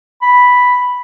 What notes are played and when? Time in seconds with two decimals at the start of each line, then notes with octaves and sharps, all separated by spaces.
0.22 B5